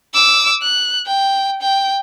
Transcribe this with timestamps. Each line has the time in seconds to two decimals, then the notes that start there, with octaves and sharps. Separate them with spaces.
0.14 D6 E6
0.62 F#6
1.06 G5
1.62 G5